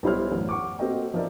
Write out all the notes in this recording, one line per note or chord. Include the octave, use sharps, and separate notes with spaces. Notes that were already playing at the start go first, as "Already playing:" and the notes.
B1 G3 E4 C5 C#5 F6
A1 F#2
F#5 C#6 D6
A#3 C4 F#4 A4 D#5 G5
F3 D#4 A#4 D5 E5